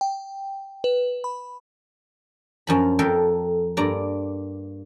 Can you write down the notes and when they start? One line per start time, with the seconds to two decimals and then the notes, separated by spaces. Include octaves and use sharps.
0.01 G5
0.84 B4
1.24 B5
2.67 F#2 F3 B5
2.99 F2 A4 A#4 G5
3.77 G2 A#3 D5 A#5